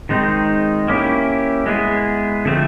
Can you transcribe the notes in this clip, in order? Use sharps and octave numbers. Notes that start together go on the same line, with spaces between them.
D#3 G#3 C4 D#4
A#3 C#4 E4 G4
G#3 B3 E4 G#4
D3 F3 A3 C4